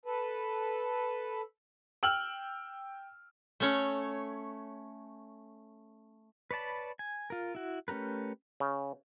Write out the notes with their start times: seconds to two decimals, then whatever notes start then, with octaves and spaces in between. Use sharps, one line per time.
0.05 A4 B4
2.03 G5 E6 F6 F#7
3.60 A3 C#4 C#5
6.51 B4 C#5 D5 A5 B5
6.99 G#5
7.30 F4 A#4
7.55 E4 F#4
7.88 A3 C#4 G4 A#4 B4
8.60 C#3